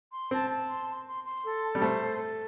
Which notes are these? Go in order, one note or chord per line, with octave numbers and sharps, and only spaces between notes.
C6
C4 A5
A5
C6
C6
C6
C6
A4
A5
G3
A3 C5
A4
A4